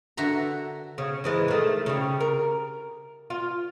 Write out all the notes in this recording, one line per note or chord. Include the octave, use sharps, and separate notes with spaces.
D3 F#4 E5 A#5
C#3
G#2 E3 G#3
D#3 A3
C#3 G3
A#4
F4